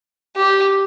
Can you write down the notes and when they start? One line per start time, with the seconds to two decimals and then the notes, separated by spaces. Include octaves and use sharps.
0.36 G4